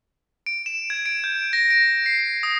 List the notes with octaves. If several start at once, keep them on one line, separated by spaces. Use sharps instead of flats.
D7
E7
G#6
D7
G6
A#6
D7
C7
D#6